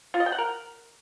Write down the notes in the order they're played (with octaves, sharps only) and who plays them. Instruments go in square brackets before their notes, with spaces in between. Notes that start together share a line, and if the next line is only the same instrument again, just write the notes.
[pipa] F4
D#5
G5
F#5
A#4